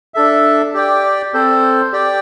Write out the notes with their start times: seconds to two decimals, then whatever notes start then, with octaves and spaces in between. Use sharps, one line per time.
0.14 D4 A4 E5
0.74 G4 D5 G5
1.34 C4 A4 C5
1.93 G4 D5 G5